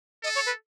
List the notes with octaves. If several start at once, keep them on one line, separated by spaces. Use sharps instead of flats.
A4 D#5
C#5
B4